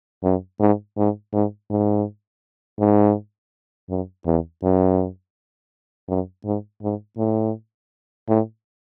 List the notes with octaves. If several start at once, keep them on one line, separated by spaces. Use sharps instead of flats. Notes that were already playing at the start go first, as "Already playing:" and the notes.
F#2
G#2
G#2
G#2
G#2
G#2
F#2
E2
F#2
F#2
G#2
G#2
A2
A2